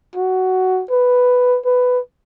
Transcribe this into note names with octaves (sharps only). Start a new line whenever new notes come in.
F#4
B4
B4